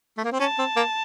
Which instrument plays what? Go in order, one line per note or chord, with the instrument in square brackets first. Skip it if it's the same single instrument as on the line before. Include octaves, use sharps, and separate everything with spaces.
[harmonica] A3
A#3
C4
[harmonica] C#4 [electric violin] A5
[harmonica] C4
A#3